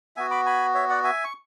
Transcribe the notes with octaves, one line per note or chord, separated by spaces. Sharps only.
B3 F#4 E5 G#5
B5 D6
G#5 B5
C#5 E5
D5 F#5
E5 G#5
C#6